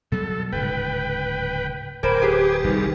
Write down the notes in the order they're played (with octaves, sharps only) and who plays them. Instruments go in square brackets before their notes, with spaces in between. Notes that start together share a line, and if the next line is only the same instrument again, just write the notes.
[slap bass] B2 F#3 G3 [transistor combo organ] A4
[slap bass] D1 G#2 C#3 [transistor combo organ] B4 G5
[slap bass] D1 [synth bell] A#4 C5 B5 [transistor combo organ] G5 G#5 D6
[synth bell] G4 G#4 B4
[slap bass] F1 C2 [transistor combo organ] D#3 G3